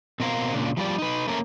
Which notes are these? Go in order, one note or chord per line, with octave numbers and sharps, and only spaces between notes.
B2 C4 A#4 B4 F5
A#2 C#3 D4
F3 G3 A#4 D5
D#4 B4
A3 A#3 C#4 A#4